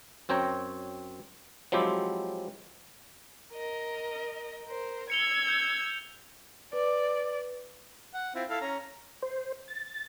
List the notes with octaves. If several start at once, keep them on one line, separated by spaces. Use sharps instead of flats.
F#2 C4 C#5 G5 A#5
F3 F#3 G#3 C4 E4 G4
A#4 D#5
A#4 C5
E6 G#6 C#7 F7 G7
G6 C#7 F7
B4 D5
F#5
C4 E4 F4
E4 A4 F5
C#4 A#5
C5
A6